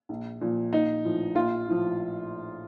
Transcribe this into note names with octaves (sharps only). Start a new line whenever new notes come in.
A#1
A#2 F3
A#1 D#4
A2 F3
A#1 F4
A2 F3